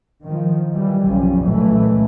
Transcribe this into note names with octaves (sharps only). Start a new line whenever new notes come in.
D#3 F3
E3 G3
F#1 B1 F3 G3 C#4
C#2 A#2 E3 F#3 A3